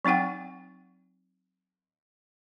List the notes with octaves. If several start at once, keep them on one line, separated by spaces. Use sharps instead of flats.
F#3 C4 D#4 F#5 G5